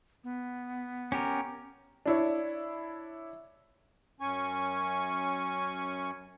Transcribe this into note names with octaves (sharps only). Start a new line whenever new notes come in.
B3
C#4 G4 A#4
D4 E4 C#5
F#2 C#4 G#5 C#6